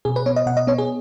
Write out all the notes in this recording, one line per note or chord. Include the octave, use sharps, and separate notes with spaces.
B2 G#4
B4
B3 C#5
D#5
B2 F#5
D#5
B3 C#5
G#4